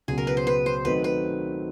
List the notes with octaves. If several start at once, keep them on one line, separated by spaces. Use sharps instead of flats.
C#2 B2 F#3 G#4
A#4
B4
C5
B4
C5
D#3 F#3 A3 C4 D#4 B4
B4